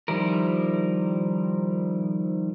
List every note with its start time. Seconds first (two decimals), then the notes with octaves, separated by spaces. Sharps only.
0.08 D#3 F3 G3 E4 A#4